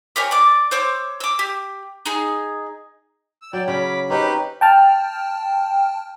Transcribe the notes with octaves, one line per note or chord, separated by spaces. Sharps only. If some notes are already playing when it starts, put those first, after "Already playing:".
G4 A#4 C#5 G#5
D5 D6
C5 C#5 D6 E6
D6 E6
G4
D#4 G#4
E6
F#3 D5 G5
C#3 C#4 B5 D6
C4 C#4 D#4 G4 B4
G5 A5 F6